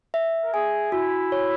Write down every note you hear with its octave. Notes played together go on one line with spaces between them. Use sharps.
E5
A#4
G#4 G#5
E4 F#4
C#5